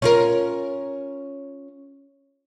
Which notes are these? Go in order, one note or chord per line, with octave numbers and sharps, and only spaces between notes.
C#4 F4 A#4